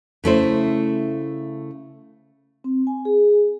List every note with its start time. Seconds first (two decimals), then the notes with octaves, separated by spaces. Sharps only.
0.24 C#3 A3 E4 C5
2.64 C4
2.87 G#5
3.05 G#4